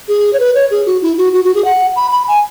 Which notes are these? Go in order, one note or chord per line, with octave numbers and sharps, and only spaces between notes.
G#4
C#5
B4
C#5
G#4
F#4
E4
F#4
F#4
F#4
G#4
F#5
B5
B5
G#5